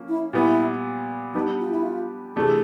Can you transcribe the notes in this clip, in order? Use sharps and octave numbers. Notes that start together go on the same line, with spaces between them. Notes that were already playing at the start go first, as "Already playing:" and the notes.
Already playing: F3 A#3 C#4
E4
A#2 G3 B3 E4
G3 B3 D4 D#4 G4
F4
E4
F4
C3 E3 A3 D4 G#4